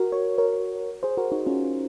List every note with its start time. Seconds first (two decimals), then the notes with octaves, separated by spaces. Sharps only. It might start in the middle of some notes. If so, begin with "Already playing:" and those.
Already playing: F#4 A#4
0.12 C#5
0.38 A#4 C#5
1.03 G#4 C5
1.17 F#4 A#4
1.32 D#4 F#4
1.46 C#4 F4